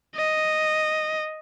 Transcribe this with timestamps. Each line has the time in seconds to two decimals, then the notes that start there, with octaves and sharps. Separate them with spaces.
0.16 D#5